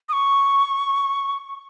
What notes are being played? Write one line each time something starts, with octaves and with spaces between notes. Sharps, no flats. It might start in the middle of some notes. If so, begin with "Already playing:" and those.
D#6
C#6